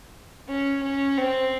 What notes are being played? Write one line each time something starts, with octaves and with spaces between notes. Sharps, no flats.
C#4
C#4
C4